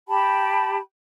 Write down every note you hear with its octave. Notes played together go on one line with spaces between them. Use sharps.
G4 G5 A5 B5